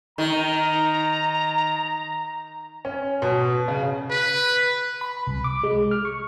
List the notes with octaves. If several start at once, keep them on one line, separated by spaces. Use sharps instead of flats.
D#3 A#5
C#4
B2
C#3
B4
B5
C2
D6
G#3
F6
C#6